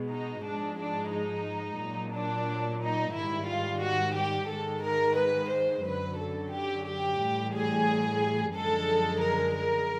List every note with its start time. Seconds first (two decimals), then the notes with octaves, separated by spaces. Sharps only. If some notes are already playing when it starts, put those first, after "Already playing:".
Already playing: B2 G#3
0.12 D#4
0.45 G#2 F3 G#3 D4
0.80 D4
1.12 D#4
1.80 A#2 F#3
2.14 D4
2.82 D#4
3.16 G#2 D#3 G3 E4
3.49 F4
3.83 F#4
4.16 G4
4.50 G#2 D#3 G#3 A4
4.85 A#4
5.18 B4
5.52 C5
5.86 F#2 D3 F#3 B4
6.20 A4
6.53 G4
6.87 G4
7.20 A2 E3 G3
7.54 G#4
8.56 F#2 D3 F3 G#3 A4
9.23 A#4
9.58 A#4